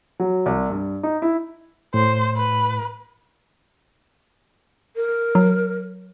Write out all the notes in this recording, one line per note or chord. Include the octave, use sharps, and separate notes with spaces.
F#3
C2
G2
D#4
E4
A2 C5
B4
A#4
F#3